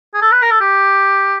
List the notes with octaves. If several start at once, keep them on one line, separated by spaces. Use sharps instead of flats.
G#4
A4
B4
A#4
A4
G4